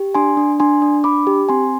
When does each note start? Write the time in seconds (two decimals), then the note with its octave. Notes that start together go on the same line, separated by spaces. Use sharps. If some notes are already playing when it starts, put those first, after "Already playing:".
Already playing: G4
0.15 D4 G#5 C6
0.37 D4
0.60 D4 G#5 C6
0.82 D4
1.04 D4 B5 D6
1.27 G4
1.49 C4 G#5 C6